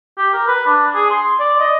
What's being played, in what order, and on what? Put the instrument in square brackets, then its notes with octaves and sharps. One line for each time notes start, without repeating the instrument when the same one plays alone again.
[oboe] G4
A#4
B4
D4
G#4
C6
D5
D#5